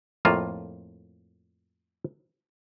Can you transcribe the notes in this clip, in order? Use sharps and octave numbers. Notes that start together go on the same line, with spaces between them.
F2 A2 A#3 F4 A5